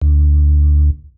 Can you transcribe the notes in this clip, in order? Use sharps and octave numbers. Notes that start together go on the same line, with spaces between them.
D2